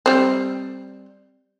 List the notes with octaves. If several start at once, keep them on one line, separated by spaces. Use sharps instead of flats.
G3 C4